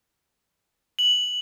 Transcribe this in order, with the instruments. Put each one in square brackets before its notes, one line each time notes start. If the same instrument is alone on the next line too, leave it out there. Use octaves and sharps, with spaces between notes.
[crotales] F#7